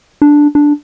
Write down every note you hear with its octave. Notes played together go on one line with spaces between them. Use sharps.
D4
D4